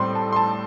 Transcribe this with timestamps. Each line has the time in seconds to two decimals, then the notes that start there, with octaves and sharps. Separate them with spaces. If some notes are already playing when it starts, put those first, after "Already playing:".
Already playing: A2 G3 C4 C6
0.15 A5
0.32 C6
0.36 A5